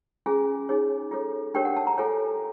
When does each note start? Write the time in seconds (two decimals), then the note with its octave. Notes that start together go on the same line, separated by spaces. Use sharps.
0.26 C#4 F4 G#4 G#5
0.69 D#4 G#4 C#5
1.11 F4 A4 C#5
1.54 D4 G4 A#4 C#5 G5
1.65 F#5
1.76 A5
1.87 A#5
1.98 F4 A4 C#5 G#5